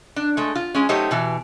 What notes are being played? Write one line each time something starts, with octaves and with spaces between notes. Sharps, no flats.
D4
G#3 A3
F4
G#3 C#4
F#3 A3 D#4 G4 C5 C#5
B2 E3